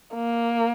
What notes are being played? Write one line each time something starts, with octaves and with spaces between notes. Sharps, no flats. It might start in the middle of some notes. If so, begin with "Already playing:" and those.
A#3